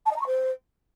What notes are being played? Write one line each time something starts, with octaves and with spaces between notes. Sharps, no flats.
A5
D#5
A#5
C#6
C5